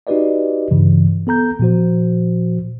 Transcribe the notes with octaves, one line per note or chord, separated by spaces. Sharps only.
D#4 F#4 G4 B4 D5 D#5
G2 C#3 E3
B3 A4 A#5 G6
A#2 F3 F#4 C5